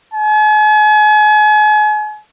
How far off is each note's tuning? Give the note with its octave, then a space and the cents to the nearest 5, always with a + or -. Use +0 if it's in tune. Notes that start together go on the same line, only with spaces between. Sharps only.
G#5 +40